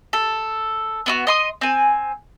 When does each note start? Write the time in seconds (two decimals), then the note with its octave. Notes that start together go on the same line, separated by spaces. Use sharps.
0.13 A4
1.06 B3 E4 F#4
1.27 D#5 C6 D#6
1.61 C4 G#5